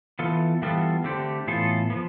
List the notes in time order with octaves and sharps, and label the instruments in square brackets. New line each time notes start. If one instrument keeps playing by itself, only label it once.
[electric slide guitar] E3 B3 F4 A4
E3 G3 B3 F4 A4
D3 A3 C4 G4
A2 E3 B3 F4 A4
F3 B3